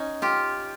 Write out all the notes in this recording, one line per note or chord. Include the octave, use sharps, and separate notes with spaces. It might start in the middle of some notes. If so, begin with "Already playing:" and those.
Already playing: C#4 D#4
F4 G4